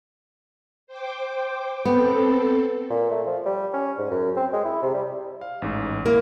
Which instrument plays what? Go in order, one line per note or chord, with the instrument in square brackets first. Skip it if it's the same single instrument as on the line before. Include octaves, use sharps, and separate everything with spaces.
[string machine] C5 G5 D6
[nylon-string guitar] B3 [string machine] C4 A4
[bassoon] A#2
A3
F3
G3
C#4
G#2
F#2
C4
G#3
E4
C3
G3
[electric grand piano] F5
A1 G#2
[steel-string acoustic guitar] A#3 [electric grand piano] E4 A#4